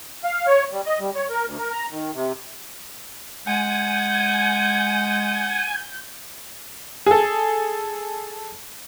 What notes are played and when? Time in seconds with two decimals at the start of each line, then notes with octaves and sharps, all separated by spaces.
0.24 F5
0.47 C#5
0.72 G3
0.86 D#5
0.99 G3
1.15 C#5
1.30 A#4
1.46 D2
1.58 A#4
1.72 A#5
1.91 D#3
2.14 C3
3.47 G#3 F#5 G#5 G6
7.06 G#4 A4